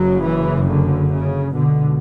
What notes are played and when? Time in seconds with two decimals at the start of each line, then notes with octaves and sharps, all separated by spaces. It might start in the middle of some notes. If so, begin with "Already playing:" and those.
Already playing: F#1 F#2 C#3 F#3
0.25 E3
0.69 D3
1.11 C#3
1.54 C#2 B2 D3